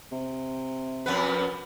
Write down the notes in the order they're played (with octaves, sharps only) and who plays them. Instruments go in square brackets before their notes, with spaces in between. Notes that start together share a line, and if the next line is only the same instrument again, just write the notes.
[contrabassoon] C3
[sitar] F2 B3 B4